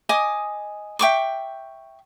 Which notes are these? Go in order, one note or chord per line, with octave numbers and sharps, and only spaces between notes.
D#5 G#5 D6 D#6
E5 G5 C#6 D6